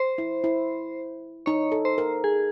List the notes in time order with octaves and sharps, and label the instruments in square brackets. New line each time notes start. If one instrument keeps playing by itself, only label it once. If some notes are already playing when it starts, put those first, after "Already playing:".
Already playing: [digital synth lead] C5
[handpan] E4
E4
[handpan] D#4 [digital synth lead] C#5
[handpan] A4
[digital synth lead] C5
[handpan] A#4
[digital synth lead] G#4